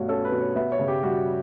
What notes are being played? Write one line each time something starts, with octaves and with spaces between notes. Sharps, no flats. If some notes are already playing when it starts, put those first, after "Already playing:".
Already playing: G2 B2 A3 F#4 C#5
C#4 A4
B4
B2
C#5
B3 E5
C#5
C#3
G4
G3 F#4